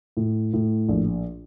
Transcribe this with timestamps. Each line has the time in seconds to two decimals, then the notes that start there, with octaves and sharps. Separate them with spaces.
0.17 A2
0.54 A2
0.89 A#1